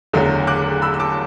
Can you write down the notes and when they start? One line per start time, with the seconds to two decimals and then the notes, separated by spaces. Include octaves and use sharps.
0.13 F#1 E2 D3 F#3 A3
0.47 D6 F#6
0.82 B5 E6
0.94 E6
0.99 A5 D6